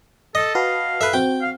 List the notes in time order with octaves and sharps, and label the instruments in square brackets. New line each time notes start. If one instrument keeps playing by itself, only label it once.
[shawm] A4 [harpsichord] D#5
[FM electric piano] F#4 B4 A5 [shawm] F5
[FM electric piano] A4 [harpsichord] B4 E5
[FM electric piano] C4 F#4 [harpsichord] G5
[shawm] F5